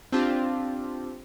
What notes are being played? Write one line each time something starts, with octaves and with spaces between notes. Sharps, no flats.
C4 D4 F4 G4